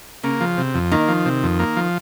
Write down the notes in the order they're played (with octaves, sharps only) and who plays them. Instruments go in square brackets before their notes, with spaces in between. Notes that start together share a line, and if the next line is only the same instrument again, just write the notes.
[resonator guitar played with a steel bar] C#3 [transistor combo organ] A#3
[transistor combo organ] F3
C3
F2
[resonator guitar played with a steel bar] D#3 [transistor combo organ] A#3
[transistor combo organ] F3
C3
F2
A#3
F3